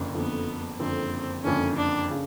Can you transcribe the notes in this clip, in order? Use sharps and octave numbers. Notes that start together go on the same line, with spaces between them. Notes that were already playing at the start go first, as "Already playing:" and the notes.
Already playing: F#1 F2 D3
F#1 F2 D3 B3
F#1 F2 D3 C4
F#1 F2 D3 C#4
D4
C#3